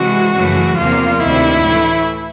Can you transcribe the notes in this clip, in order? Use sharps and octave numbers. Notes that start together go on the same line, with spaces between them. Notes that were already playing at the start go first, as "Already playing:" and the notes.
Already playing: C3 E3 G#3 F#4
F#2 C#3 E3 A3
E2 C3 F3 A#3 F4
D2 C3 D#3 E4
A2 E3 A3